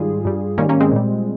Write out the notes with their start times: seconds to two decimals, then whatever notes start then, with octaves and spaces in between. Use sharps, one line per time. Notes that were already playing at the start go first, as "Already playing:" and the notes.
Already playing: G#2 D#3 G3 F4 G#4
0.25 G2 G3
0.58 G#2 D#3 G3 A#3 C#4
0.69 A#3 C#4
0.80 G#3 C4
0.92 A#2 G3